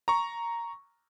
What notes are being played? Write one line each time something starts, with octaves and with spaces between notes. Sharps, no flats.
A#5 C#6